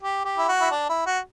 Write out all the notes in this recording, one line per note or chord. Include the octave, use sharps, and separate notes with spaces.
G4
G4
E4
F#4
E4
D4
E4
F#4